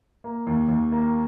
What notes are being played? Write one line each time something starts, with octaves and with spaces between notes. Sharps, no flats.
A#3
D#2
D#2
A#3